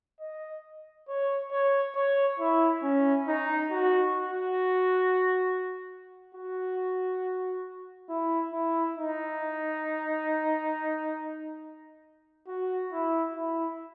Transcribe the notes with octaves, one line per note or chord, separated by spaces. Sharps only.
D#5
C#5
C#5
C#5
E4
C#4
D#4
F#4
F#4
F#4
E4
E4
D#4
F#4
E4
E4